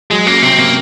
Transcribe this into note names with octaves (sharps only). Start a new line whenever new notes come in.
F#3 G#3
A#3 C#4
C3 C4
C3 A#3